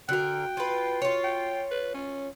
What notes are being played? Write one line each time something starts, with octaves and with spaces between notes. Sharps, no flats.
D3 F#4 A#4 G5 F#6
F4 B4
F4 C#5
G5
B4
C#4